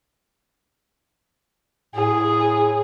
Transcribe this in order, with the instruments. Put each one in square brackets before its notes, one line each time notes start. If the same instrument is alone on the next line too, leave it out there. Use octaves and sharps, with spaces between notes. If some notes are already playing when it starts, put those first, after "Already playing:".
[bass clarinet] A2 [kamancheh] G#4